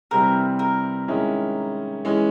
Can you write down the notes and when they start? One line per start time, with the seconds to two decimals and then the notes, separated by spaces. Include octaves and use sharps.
0.11 C3 E3 G3 C4 E4 A#4
0.59 A#4
1.08 D#3 G#3 C#4 E4
2.05 E3 G#3 C#4